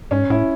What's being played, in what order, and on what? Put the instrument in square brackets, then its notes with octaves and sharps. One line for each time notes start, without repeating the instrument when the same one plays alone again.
[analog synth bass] G#2 [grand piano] C#4
[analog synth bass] A2 [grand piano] E4